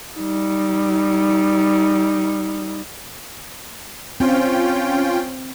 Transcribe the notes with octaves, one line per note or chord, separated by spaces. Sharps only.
G3 D#4
C4 C#4 F4 G5